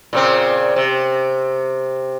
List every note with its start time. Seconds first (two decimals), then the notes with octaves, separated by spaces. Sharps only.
0.13 A#2 C#3 C4
0.76 C3